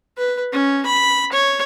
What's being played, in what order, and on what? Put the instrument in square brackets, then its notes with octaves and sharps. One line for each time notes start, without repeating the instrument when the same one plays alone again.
[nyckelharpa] B4
C#4
B5
C#5